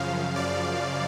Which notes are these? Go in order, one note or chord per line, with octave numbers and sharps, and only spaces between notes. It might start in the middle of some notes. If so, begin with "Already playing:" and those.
Already playing: F#2 C#3 F3 F5
D5